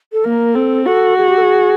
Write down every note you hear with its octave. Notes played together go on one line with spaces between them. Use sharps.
A4
A#3 A#4
C4 A4
F#4 A4
G#4
G4
A4
G#4